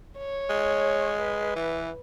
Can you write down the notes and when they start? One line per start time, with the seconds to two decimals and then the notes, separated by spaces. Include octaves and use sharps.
0.18 C#5
0.50 G#3
1.22 B4
1.56 E3